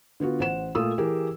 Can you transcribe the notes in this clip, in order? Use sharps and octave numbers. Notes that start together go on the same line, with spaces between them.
D3 B3 F4 F#4
A1 C5 F#5 E7
A#2 A3 F4 D#6 E6
E3 G4 G#4 A#4